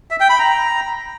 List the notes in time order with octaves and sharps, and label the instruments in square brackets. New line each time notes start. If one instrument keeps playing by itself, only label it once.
[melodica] E5
G5
B5
A#5